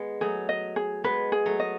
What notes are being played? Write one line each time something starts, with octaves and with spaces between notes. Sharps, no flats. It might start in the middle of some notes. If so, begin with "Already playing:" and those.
Already playing: G#3 B3
F#3 A3 G#4
D#5
G#4
G#3 B3 B4
G#4
F#3 A3
D#5